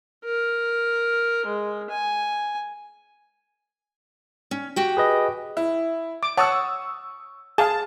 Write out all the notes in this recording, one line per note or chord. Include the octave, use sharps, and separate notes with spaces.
A#4
G#3
G#5
C#4
F#4 G4 G5
G#4 B4 D#5
E4
D6
C#5 F#5 A5 C#6 D#6 E6
G#4 F5 A5